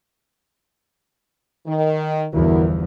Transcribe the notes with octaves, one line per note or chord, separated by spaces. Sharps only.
D#3
G1 E2 F3 E4 F#4 A#4